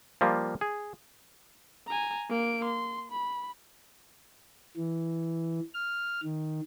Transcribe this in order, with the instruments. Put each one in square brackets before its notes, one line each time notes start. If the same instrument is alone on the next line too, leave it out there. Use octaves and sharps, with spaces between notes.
[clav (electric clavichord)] F3 G3 A#3 F4
G#4
[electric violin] G#5 A#5
A#3 D7
C6
B5
[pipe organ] E3
F6
D#3